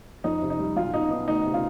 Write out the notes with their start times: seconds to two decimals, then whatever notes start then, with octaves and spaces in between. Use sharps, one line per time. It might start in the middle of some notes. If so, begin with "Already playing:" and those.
0.24 F2 D#4
0.42 C3
0.50 D#4
0.59 G3
0.76 B1 F4
0.94 B2 D#4
1.11 B3 D#4
1.28 D2 D#4
1.45 C3
1.54 F4